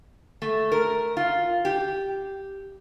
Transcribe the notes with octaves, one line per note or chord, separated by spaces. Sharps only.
A3
A#4
F4
G4